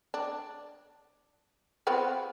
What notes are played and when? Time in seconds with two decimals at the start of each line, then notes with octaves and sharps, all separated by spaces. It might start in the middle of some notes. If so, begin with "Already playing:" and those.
0.14 D4
1.87 F3 B3 C4